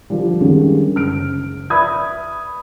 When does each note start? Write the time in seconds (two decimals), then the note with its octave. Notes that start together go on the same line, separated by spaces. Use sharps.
0.10 D3 F3 G3
0.41 D3 D#3 G3 G#3 C#4
0.95 F#1 F6 D7
1.70 B4 D5 E5 B5 D#6 G#6